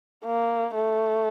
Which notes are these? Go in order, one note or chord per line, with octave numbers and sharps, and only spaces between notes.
A#3
A3